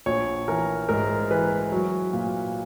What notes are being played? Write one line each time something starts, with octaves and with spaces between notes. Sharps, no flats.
A#1 C#5
E3 A#4
G#2 A#4
E3 B4
F#3
A#2